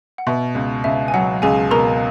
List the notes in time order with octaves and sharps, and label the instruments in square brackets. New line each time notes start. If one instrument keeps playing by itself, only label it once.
[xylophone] F#5
[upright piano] B2 [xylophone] E5
[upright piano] C#2
[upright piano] C#2 [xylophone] E5
[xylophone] G#5
[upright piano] F#3 [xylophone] F#5
[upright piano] C#2 [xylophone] G#4 G#5
[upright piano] B2 [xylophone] A#4 A#5